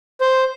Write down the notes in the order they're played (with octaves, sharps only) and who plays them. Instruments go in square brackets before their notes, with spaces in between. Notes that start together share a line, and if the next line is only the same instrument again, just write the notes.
[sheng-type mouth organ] C5